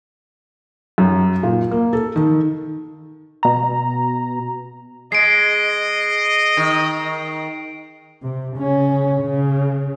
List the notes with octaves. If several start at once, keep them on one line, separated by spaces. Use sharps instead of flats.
F#2
A#2
A#3
A4
D#3
B2 A#5
G#3 D#5 C7 D7
D#3
C3
C#3 C#4
C#3